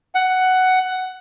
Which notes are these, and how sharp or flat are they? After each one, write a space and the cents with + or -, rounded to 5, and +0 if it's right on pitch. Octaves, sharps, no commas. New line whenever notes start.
F#5 +10